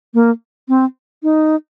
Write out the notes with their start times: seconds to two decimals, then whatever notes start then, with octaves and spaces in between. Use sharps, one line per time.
0.14 A#3
0.68 C4
1.23 D#4